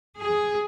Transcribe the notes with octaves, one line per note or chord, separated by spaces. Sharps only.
G#4